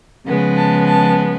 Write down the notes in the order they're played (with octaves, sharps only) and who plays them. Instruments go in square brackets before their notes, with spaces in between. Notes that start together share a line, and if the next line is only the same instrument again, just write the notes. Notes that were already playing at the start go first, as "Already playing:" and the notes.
[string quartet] C#3 F3 G#3 B3
A5
A5